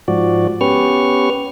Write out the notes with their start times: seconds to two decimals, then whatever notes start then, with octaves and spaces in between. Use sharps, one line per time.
0.08 G#2 F3 F#4 D5
0.61 B3 C#4 G4 B4 C#6 F6